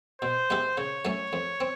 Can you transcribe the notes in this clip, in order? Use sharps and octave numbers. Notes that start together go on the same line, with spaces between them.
B2 C5
G#3 B3 E4 G4
C#3 C#5
F#3 A3 C#4
F2
C4